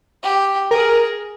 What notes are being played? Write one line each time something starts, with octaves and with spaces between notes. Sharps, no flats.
G4
G#4 A#4